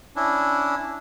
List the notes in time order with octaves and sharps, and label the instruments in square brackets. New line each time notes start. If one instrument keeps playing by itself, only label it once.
[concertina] C#4 D4 E4